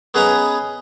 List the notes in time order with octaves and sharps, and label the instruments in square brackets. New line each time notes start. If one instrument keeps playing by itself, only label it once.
[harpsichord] B3 C#4 G#4 B4 D#5 A#5